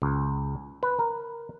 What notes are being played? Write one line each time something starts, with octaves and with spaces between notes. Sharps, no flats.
C#2
B4
A#4